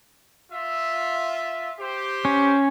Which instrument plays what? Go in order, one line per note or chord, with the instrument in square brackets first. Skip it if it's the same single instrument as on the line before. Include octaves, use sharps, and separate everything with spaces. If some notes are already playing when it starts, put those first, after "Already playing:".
[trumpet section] F4 E5
G4 C5
[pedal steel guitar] C#4